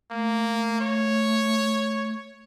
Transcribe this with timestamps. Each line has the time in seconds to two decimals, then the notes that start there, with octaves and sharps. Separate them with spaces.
0.11 A3 A#3
0.81 C#5